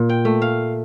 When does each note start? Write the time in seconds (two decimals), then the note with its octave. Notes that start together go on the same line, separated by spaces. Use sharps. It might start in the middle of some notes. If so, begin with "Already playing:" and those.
Already playing: A#2
0.09 G5
0.25 A3
0.42 F5